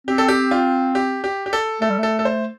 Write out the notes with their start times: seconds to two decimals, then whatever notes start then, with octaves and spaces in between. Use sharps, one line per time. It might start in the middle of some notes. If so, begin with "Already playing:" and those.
0.07 C4 G4
0.18 A4
0.28 G4
0.51 F4
0.95 G4
1.24 G4
1.46 G4
1.53 A4
1.81 A3 A4
1.90 G3
1.99 A3 A4
2.19 A4
2.25 C5